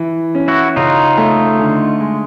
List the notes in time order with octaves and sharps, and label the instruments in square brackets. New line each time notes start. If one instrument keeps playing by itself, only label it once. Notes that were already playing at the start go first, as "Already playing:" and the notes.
Already playing: [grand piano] E3
C#4
[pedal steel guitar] E4 F#4
[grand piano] C#3 [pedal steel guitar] D#4 F4
[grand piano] A3
D3
G#3